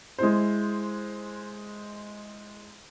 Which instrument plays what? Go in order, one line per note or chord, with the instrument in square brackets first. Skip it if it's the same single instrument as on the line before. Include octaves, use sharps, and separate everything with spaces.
[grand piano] G#3 E4 C5